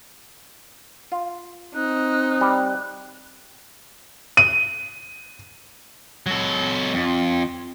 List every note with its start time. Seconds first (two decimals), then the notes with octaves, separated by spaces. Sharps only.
1.12 F4
1.75 C4 D#4 F#6
2.41 G3
4.37 D#7
6.27 F#3 A4
6.94 F2